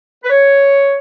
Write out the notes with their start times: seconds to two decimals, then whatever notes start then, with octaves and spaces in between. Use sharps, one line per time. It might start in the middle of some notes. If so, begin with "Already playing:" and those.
0.24 B4
0.30 C#5